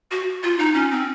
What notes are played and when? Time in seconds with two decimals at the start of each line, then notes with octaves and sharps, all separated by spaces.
0.11 F#4
0.43 F4
0.59 D#4
0.74 C#4
0.91 C4